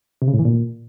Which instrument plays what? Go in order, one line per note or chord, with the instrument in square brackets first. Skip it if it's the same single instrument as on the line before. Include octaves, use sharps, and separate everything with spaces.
[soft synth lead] C3
C#3
A2
E3
A#2